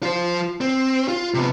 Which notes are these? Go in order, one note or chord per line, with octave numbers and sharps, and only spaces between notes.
F4 C5
C4
F4
C3 B3